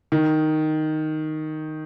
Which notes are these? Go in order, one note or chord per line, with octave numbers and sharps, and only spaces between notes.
D#3